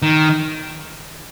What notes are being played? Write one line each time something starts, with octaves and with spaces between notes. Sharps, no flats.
D#3